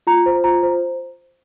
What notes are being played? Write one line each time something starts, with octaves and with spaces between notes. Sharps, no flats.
F4 A#5
C5
F4 A#5
C5